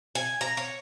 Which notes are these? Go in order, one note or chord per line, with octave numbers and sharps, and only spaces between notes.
G#5
A#5
C#5